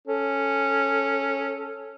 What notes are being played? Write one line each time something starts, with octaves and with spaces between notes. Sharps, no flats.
C#4 A4